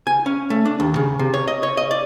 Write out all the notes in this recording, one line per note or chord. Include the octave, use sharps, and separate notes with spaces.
G#5
C#4
A3
D4
D#2
C#3
C3
C#5
D#5
C#5
D#5
D5